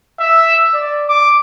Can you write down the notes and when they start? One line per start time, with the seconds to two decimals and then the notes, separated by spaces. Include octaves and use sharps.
0.19 E5
0.73 D5
1.09 D6